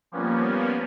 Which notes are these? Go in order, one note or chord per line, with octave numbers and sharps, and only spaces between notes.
F3 G3 A#3 B3 C#4